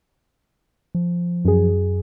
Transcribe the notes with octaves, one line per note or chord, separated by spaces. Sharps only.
F3
F#2 G#4